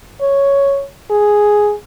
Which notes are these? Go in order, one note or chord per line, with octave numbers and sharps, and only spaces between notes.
C#5
G#4